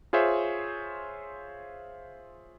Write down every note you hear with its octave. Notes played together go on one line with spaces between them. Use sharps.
F4 G#4 C5 C#5 E5